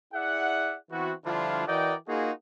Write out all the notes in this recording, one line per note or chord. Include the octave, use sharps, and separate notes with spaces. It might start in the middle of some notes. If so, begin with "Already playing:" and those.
E4 G#4 D5 E5 F#5
E3 B3 C4 E4 F#4
D3 F3 G3 D4 E4 F4
E3 F#4 A#4 D5 D#5 G5
A#3 D#4 F4 F#4 G#4